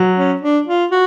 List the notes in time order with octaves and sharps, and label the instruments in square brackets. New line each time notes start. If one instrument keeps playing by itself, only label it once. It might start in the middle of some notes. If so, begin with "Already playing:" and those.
Already playing: [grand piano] F#3
[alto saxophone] C#4
D4
F4
F#4